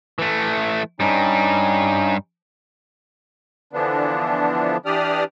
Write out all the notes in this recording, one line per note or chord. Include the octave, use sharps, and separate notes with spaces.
E3 A3
G2 G3 C#4 D#4
D3 E3 F3 B3 D4
E3 D4 G4 D5 D#6 F6